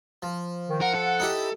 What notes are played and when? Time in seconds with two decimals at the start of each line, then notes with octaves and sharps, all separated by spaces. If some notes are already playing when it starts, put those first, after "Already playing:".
0.22 F3
0.68 D#3
0.81 A#4 F#5
0.95 A4
1.20 D#4 E4 G4